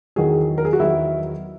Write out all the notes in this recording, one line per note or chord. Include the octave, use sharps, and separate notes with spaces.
E2 D#3 F#3 G#4
A#4
G#4
F#4
E2 D#3 F#3 E4